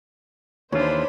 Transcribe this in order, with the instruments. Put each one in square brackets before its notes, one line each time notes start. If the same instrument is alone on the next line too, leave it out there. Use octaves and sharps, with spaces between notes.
[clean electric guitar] D#2 E3 F4 [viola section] D4 C5 B5 [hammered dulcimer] C#5